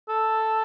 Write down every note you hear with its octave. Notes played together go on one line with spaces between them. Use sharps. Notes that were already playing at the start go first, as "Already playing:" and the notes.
A4